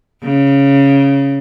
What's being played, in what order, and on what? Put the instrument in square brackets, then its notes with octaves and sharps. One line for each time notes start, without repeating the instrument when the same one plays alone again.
[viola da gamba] C#3